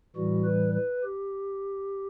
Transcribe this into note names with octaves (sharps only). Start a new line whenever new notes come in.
A2 E3 G3 F#4
B4
B4
G4